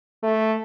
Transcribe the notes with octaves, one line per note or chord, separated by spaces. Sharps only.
A3